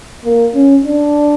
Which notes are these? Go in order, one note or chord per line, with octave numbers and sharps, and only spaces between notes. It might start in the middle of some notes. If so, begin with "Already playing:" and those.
A#3
C#4
D4